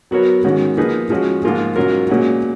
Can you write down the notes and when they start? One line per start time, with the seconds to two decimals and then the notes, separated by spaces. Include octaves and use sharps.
0.11 F#3 B3 F#4 A#4 C#5
0.44 G#2 D#3 G#3 C#4 F#4
0.77 F3 A#3 D#4 G#4 B4
1.10 F3 G#3 C#4 F#4
1.43 G#2 F3 A#3 F4 G#4
1.76 G#2 F#3 C#4 F4 A#4
2.10 A#2 G#3 C#4 F#4